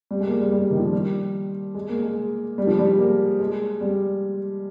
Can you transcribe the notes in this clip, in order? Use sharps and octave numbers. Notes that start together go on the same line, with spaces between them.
G3
G#3
A#3
G#3
G3
G3
D#3
F3
G3
G#3
A#3
G#3
G3
F3
G3
G#3
A#3
G#3
G3